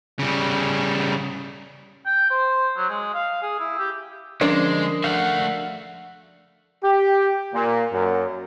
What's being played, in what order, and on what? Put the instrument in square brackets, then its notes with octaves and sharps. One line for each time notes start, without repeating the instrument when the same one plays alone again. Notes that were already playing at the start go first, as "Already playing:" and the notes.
[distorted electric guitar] C#3 G3
[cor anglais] G5
C5
F#3
G#3
F5
G#4
E4
G4
[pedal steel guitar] D3 C5 [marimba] F3 C#4 [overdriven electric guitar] G#3 [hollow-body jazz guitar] D4 A#4 D5
[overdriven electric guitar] A3 F#4 [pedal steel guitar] F5 F#5
[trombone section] G4
A#2
F#2